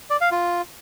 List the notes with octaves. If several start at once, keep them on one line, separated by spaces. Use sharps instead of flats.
D5
F5
F4